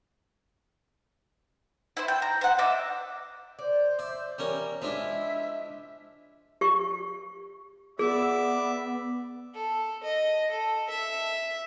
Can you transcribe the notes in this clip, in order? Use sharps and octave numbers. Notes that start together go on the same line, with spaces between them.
E4 C5
G5
A#5
C5 F#5
D#5 E5 D6
C5 D5
D5 E5
E3 G3 C#4 A#4
F3 G#3 D4 E4 E5
G4 C#6
B3 G#4 D5 E5
A4
D#5
A4
E5